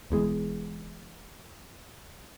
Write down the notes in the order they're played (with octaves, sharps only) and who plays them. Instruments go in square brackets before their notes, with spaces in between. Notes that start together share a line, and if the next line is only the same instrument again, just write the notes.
[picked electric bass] E1 E2 G#3